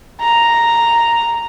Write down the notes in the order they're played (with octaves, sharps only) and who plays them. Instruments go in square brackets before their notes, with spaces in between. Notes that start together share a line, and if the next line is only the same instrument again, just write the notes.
[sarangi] A#5